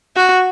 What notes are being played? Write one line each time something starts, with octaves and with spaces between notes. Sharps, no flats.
F#4